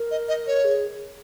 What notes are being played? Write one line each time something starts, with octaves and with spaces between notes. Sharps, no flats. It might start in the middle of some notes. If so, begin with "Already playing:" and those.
Already playing: A#4
D#5
D#5
C#5
G#4